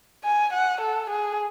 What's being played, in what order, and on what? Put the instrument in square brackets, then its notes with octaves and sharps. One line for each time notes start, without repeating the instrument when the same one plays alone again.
[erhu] G#5
F#5
A4
G#4